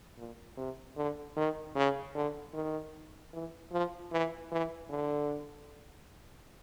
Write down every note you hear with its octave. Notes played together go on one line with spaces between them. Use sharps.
A#2
C3
D3
D#3
C#3
D3
D#3
E3
F3
E3
E3
D3